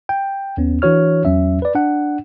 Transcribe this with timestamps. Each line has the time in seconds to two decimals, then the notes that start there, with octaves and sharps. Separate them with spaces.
0.09 G5
0.57 D#2 B3 C#4
0.82 E3 D4 F#4 C#5 F6
1.25 E2 F#3 C#4 E5
1.62 B4 D5
1.75 D4 F#5